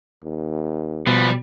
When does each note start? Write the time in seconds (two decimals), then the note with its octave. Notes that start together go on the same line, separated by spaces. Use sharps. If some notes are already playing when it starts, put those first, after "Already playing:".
0.23 D#2
1.07 B2 F3 G3 B4